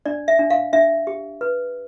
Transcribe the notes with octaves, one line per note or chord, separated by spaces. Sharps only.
D4 D5
E5
D4
F5
D4 E5
G4
B4